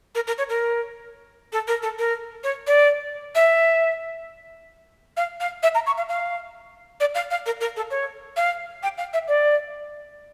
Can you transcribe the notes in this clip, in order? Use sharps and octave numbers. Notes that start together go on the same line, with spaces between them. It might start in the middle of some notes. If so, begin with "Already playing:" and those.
A#4
A#4
C#5
A#4
A4
A#4
A4
A#4
C#5
D5
E5
F5
F5
E5
A#5
C#6
F5
F5
D5
F5
F5
A#4
A#4
A4
C#5
F5
G5
F5
E5
D5